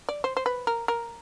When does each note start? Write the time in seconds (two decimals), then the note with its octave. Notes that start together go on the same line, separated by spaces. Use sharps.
0.09 D5
0.24 C5
0.37 C5
0.46 B4
0.67 A#4
0.88 A#4